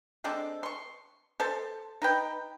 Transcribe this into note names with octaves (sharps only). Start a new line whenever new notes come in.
G#3 C4 D4 A4
C6 C#6
A4 C5 A5
D#4 B4 G5